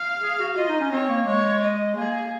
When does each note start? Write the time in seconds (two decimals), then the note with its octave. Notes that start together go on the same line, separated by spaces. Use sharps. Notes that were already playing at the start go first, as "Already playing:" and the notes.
Already playing: F5
0.22 G#4
0.39 F#4
0.57 F4 D#5
0.69 D#4
0.81 C#4
0.91 C4 C#5
1.09 A#3
1.26 G#3 C#5
1.61 D#5
1.96 A#3 G#4